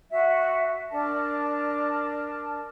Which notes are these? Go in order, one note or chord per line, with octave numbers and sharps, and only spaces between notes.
F#4 E5
D4 A#4 A5